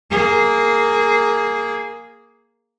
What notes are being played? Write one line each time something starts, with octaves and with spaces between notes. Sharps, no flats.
A#3 G#4